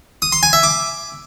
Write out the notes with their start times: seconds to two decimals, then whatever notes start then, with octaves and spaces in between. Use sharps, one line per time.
0.22 D#6
0.32 C6
0.43 G#5
0.53 E5
0.63 D6